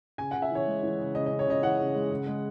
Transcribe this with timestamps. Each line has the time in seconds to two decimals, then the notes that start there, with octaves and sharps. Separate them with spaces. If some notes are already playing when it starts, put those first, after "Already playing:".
0.18 C#3 G#5
0.31 C#3 F#5
0.42 E5
0.51 E3 C#5
0.67 G#3
0.83 E3
0.99 C#3
1.15 C#3 D#5
1.26 C#3 D#5
1.39 C#5
1.47 C#3 D#5
1.62 E3 F#5
1.79 C#3
1.95 G#3
2.11 C#3
2.27 G#3